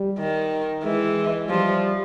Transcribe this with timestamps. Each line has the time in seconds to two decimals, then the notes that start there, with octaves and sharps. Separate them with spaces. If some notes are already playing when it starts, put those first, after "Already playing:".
Already playing: G3
0.19 D#3
0.84 E3 G#3
1.49 F3 G3